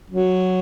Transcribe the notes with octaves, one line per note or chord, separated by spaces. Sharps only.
F#3